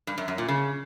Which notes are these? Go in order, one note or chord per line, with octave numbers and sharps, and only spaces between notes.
G2
F#2
F#2
A#2
C#3